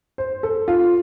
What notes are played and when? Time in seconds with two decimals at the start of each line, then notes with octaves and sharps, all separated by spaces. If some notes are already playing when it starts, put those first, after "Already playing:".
0.18 C5
0.43 A4
0.68 F4